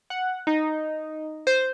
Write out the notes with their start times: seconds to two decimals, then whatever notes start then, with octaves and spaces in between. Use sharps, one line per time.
0.10 F#5
0.47 D#4
1.47 C5